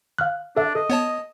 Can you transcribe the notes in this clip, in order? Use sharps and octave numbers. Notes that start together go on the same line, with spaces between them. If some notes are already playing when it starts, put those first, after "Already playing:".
F5 F6 F#6
D4 A4 E5
A4 D#5
B3 C#5 A5